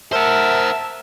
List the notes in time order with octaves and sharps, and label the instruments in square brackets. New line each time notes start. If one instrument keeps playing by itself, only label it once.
[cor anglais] A#4 [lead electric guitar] C5 F#5 [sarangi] E5 [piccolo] A5